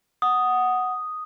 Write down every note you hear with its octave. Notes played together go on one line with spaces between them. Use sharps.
F#5 D#6